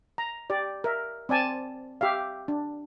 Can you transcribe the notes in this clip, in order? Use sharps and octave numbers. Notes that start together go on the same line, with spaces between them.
A#5
G4 D5
A#4 E5
C4 D5 G#5 A5
G4 E5 F5
D4